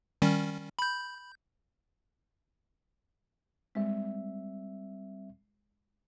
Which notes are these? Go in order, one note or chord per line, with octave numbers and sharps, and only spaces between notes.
D#3 G3 C#4
B5 G6
G3 G#3 C4 E5